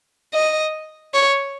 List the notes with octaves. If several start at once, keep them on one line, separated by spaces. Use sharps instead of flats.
D#5
C#5